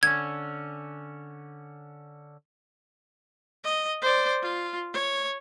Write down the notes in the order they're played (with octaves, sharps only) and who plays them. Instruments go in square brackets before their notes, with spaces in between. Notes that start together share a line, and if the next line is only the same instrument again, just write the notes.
[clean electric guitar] D3 C#4 [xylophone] G#6
[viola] D#5
C5 D5
F4
C#5